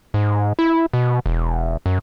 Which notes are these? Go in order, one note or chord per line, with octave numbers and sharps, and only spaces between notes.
G#2
E4
B2
E1
F#2